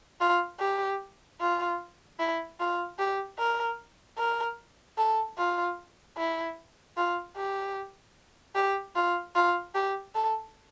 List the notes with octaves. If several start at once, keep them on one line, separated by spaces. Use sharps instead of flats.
F4
G4
F4
E4
F4
G4
A#4
A#4
A4
F4
E4
F4
G4
G4
F4
F4
G4
A4